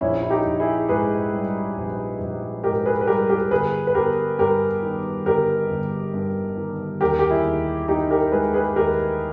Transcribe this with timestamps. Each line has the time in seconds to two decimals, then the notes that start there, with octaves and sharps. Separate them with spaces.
0.01 A#1 C#4 E4
0.23 E4
0.30 D#4 G4
0.45 A#1
0.60 E4 G#4
0.89 G#2 G#4 B4
1.33 G3
1.76 A#1
2.20 A#1
2.64 G#2 G4 A#4
2.85 G#4 B4
3.01 B4
3.07 G3 G4 A#4
3.29 G4 A#4
3.51 G1 G#4 B4
3.87 B4
3.95 G1 G4 A#4
4.39 G2 G4 A#4
4.83 D#3
5.26 G1 G4 A#4
5.70 G1
6.14 G2
6.57 D#3
7.01 D#2 G4 A#4
7.19 G4
7.30 E4 G#4
7.45 D#2
7.88 D#3 D#4 G4
8.11 G4 A#4
8.32 G#3 G#4 B4
8.54 G#4 B4
8.76 D#2 G4 A#4